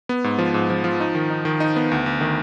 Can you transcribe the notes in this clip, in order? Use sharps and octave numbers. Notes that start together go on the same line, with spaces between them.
B3
G#2
F3
G#2
F3
F3
D#4
D#3
D#4
D#3
D#4
B3
D2
D2
D#3